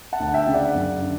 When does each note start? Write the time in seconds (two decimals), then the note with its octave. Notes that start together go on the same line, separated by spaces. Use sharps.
0.13 F#5 A5
0.20 D2
0.34 E5 G5
0.47 C#3
0.54 D5 F#5
0.75 F#2
1.02 D3